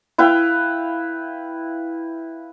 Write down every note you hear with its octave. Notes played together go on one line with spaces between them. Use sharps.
E4 B4 F5 G5